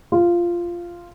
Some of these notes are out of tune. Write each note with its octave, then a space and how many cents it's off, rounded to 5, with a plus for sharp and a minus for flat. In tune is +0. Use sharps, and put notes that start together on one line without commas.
F4 -10